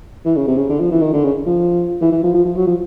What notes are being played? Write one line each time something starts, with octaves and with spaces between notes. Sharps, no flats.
E3
C#3
C3
C#3
D3
F3
E3
D#3
D3
C#3
F3
E3
E3
F3
F3
F3
F#3
F3